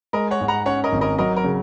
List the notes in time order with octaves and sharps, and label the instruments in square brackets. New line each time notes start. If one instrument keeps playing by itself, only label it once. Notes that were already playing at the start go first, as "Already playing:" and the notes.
[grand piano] G#3 [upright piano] A#4 D#5
[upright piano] C#5 F#5
[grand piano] G#2
[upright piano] F#5 A#5
[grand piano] C#4 [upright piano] C#5 F#5
[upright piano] A#4 D#5
[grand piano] G#1
[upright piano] A#4 D#5
[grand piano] F#3 [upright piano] A#4 D#5
[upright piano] A#4
[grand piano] C#3